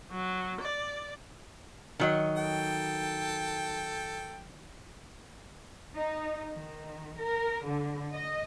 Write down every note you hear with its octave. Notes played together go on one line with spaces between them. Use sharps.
F#3
D5
D#3 F#3 D#5
A4 G5
D#4
D#3
A#4
D3
D#5